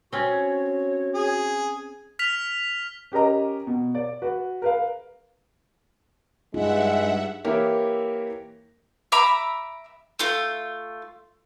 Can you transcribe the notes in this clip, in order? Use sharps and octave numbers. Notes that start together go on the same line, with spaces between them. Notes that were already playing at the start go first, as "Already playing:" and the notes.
C4 C#4 F#4 C#5
G#4
F6 B6 F7
C#4 G4 A#4 D#5 A#5
B2
D5
F#4 B4
A#4 B4 F5
G2 G#3 D#4 F4 E5 F#5
E3 A#3 G4 A#4 C#5 E5
E5 A#5 B5 D6
A3 F4